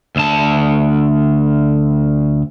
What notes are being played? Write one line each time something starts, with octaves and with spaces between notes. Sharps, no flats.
D2 A5